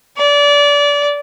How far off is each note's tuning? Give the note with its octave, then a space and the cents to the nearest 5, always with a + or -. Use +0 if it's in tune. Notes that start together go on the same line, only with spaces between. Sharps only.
D5 -25